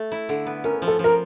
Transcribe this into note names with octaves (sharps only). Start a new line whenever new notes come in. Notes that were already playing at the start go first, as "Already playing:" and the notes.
Already playing: A3
E4
D3
B3
C#4 A#4
F3
A4
F3 A#4